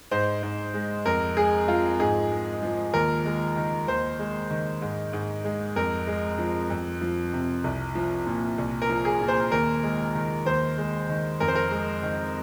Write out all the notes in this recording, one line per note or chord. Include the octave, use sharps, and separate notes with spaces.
G#2 C5
G#2
G#3
F2 A#4
G#3 G#4
F3 F4
G#2 G#4
G#3
F3
D#2 A#4
G#3
D#3
D#2 C5
G#3
D#3
G#2
G#2
G#3
F2 A#4
G#3
F3
F2
F3
C3
C2
F3
A#2
C2
A#4
F3
G#4
A#2
C5
D#2 A#4
G#3
D#3
D#2 C5
G#3
D#3
F2 A#4
C5
A#4
G#3
D#3